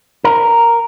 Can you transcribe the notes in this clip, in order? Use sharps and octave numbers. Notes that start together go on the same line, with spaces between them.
A#4